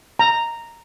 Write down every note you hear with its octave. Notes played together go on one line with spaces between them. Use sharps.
A#5